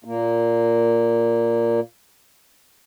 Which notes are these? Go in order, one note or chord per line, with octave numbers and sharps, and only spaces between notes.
A#2 A#3